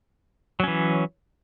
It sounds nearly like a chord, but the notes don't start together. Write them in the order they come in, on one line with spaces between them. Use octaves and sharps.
F#3 C#4 E3